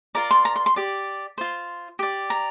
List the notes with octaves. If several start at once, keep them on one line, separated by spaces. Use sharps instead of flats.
F4 A#4 D5 A#5
C6
A#5
C6
C6
G4 D5
F4 C5
G4 D5
A#5